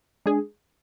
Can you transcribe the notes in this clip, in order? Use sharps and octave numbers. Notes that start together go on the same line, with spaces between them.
G#3 D4 G#4